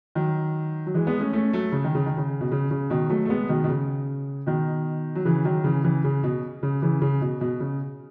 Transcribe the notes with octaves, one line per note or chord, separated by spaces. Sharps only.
D#3 F#3
F#3
E3 G#3
G#3 B3
A3 C#4
A3 C#4
F#3 A3
C#3
D#3
C#3
D#3
C#3
B2
C#3
C#3
B2 D#3
F#3 A3
A3
G#3 B3
B2 D#3
B2
C#3
B2 D#3
F#3
C#3 E3
D#3 F#3
C#3 E3
C#3 E3
C#3
B2
C#3
C#3 E3
C#3
B2
B2
C#3